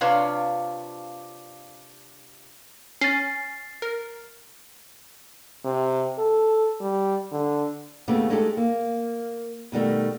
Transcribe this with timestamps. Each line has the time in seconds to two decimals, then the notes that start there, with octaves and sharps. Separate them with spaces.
0.01 C3 D4 F4 B4 C#5 F5
3.01 C#4 A6 C7
3.82 A#4
5.65 C3
6.18 A4
6.80 G3
7.32 D3
8.08 D#2 C#3 A3 B3 C4 G4
8.30 G#3 A3 D#4 G4 A4
8.57 A#3
9.72 B2 D#3 G3 A3